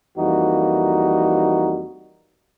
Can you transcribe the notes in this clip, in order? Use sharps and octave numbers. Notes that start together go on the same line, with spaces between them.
F2 E3 G3 A#3 D#4 F#4